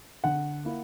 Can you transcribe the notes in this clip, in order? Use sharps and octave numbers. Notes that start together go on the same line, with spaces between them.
D3 F#5
A#3 E4